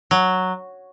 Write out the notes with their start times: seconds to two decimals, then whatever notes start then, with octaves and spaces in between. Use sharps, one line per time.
0.11 F#3